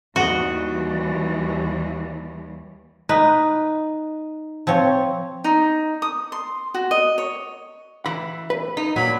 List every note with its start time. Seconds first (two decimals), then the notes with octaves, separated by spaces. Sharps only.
0.16 D#2 E3 G3 F#4 D#5
3.09 D#4 B4
4.67 F3 C4 C#5
5.44 D#4
6.02 D#6
6.32 C6
6.74 F#4
6.91 D#5
7.18 C#5
8.06 E3 B5
8.50 B4
8.77 D#4
8.96 A#2 F#3 B5